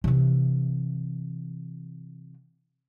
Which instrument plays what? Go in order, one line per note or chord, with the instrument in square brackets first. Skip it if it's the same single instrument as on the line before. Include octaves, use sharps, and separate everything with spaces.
[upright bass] C3 E3